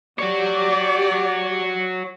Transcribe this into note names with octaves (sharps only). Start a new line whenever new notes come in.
F#4 G4 C#5 D5